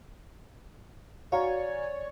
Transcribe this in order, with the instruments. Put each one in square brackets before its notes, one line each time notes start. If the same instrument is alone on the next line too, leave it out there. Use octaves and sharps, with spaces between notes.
[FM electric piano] F#4 G#5 [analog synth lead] C#5 [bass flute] D5 [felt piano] F5 A#5